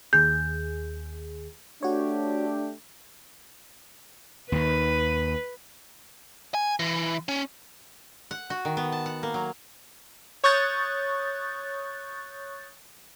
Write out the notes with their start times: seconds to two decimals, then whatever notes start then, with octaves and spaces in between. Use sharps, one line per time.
0.13 D#2 G#4 G6
1.83 A3 D4 F#4 G4 C#5
4.52 D#2 D#3 B4
6.54 G#5
6.79 E3
7.29 C#4
8.31 F#5
8.50 F#4
8.65 D#3
8.77 B3
8.92 A5
9.06 F#5
9.23 A#3
9.34 F#3
10.44 C#5 C#6 D#6 F#6 G6 A6